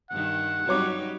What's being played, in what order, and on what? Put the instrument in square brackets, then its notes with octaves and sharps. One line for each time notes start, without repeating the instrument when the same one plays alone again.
[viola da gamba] G2 D#3 [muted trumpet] F#5
[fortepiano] F#3 C#5 D6 [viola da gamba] G3 D#4